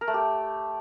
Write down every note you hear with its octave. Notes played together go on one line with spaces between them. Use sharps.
A#4
A3
G4